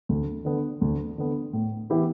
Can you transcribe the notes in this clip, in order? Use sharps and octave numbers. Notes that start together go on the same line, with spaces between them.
D2
D3 B3
D2
D3 B3
A2
E3 B3 E4 G4